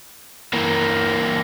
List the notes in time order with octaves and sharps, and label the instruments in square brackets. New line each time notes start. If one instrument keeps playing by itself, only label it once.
[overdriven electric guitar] E3 A#3